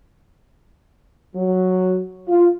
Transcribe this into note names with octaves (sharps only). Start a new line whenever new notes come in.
F#3
F4